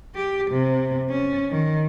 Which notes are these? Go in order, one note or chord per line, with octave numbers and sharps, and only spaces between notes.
G4
C3
C#4
D#3